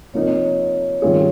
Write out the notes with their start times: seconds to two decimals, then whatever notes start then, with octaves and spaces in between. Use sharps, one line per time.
0.14 C3 F3 A#3 D#4 C#5
1.01 D#3 G3 C#4 F4 G#4 C#5